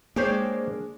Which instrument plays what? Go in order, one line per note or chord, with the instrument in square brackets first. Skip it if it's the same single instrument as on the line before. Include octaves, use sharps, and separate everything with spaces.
[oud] G#3 D4 C#5 [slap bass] A#3 [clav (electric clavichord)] G4 C5